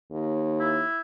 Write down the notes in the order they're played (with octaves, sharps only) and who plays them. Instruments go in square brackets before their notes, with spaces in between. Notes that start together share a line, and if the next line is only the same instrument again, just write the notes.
[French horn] D#2
[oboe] E4